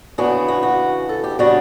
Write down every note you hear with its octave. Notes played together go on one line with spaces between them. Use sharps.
C#3 E3 B3 D4 F#4
F#4
F#4
A4
G4
C#3 G3 B3 D4 F#4